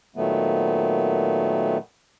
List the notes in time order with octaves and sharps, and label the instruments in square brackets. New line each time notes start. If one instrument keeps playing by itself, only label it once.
[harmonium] A#2 D#3 F#3 A3 B3